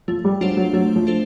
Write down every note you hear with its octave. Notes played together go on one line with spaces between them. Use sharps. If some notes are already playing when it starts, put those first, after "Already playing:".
F3 A3
G3
F#3 D4 F4 A4 C5
F#3
F#3 A3
F3
D4 F4 A4 C5